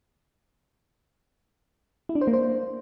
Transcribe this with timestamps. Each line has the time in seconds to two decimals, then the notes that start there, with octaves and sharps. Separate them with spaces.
2.09 E4
2.15 D4
2.21 C5
2.27 A#3
2.33 C5